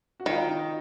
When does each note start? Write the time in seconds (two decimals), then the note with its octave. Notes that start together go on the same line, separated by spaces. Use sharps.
0.20 F#4
0.26 D#3 F4
0.48 D#4